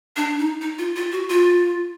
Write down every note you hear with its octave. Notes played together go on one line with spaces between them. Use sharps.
D4
D#4
D#4
F4
F4
F#4
F4